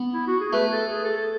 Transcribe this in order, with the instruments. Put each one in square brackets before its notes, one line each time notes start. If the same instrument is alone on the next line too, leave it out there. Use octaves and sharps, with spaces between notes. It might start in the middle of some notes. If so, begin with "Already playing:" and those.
Already playing: [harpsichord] B3
[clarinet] E4
F#4
G#4
[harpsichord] A3 [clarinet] B4
[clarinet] A4
G#4
A4
A4